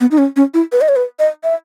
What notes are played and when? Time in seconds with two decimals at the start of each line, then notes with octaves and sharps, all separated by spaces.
0.01 B3
0.11 D#4
0.18 C#4
0.36 C#4
0.54 E4
0.72 B4
0.81 D#5
0.89 C#5
0.96 B4
1.19 D#5
1.44 E5